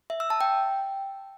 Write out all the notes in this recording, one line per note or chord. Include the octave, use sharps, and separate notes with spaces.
E5
E6
A5
G5